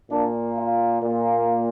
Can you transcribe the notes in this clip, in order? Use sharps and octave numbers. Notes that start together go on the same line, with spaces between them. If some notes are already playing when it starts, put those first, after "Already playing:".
A#2 A#3 D4
F4
A#2 A#3